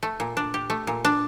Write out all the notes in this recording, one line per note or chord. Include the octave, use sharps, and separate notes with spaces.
A3
A#2
D4
G4
A3
A#2
D4